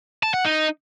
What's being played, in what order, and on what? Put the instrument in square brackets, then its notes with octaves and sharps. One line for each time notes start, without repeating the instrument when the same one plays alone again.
[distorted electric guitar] A5
F#5
D#4